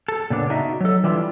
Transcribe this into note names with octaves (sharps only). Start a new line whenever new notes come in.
A4
A#2 C#3 B3 D4
D4 D#4 F#4 D#5 E5
F#3 A4
E3 G3 D4 E4 F4